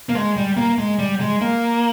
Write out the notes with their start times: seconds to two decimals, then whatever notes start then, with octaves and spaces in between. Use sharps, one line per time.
0.09 A#3
0.15 G#3
0.36 G3
0.57 A#3
0.78 G#3
0.99 G3
1.20 G#3
1.41 A#3